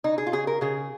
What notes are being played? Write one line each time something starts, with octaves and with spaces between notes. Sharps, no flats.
C#3 D#4
G#4
F4
C#3 G#4
A#4
C#3 G#4